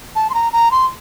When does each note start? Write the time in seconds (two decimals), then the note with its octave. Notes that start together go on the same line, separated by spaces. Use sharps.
0.16 A5
0.30 C6
0.34 A#5
0.53 A#5
0.71 C6